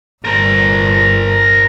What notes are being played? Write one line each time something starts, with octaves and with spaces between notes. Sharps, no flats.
G1 A#4 C5